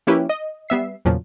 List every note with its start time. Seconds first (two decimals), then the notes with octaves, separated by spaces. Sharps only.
0.07 F3 A#3 C#4 E4 G4 B4
0.29 D#5
0.69 G3 B3 E5 C7
1.05 E2 A#2 C#3 F3 F#3